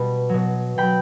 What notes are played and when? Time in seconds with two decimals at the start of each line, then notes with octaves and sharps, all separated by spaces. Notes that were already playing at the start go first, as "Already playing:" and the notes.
Already playing: B2 G3 B5
0.29 B2 F#3
0.78 B2 F#3 G5 B5